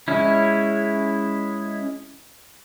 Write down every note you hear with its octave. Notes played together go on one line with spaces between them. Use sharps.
G#3 C#4 E4